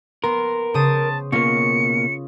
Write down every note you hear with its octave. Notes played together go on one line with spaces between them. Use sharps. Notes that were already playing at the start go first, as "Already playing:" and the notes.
B3 A#4 C6
C#3 C5 A5 D#6
B2 A#3 C#4 F4 A#4 C#7